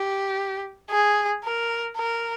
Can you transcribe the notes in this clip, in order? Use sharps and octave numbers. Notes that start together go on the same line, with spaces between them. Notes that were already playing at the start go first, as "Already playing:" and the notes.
Already playing: G4
G#4
A#4
A#4